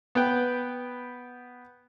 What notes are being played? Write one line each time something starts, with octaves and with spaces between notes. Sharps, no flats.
B3 B4 G5